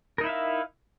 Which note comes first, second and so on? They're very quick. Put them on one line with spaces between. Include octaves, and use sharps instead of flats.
A#4 D#4 E4 E5 F5